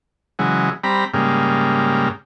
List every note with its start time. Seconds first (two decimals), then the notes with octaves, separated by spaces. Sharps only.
0.39 C#3 E3 F#3 G#3
0.84 G3 C4 A#5 B5
1.14 G#2 C#3 G3 A#3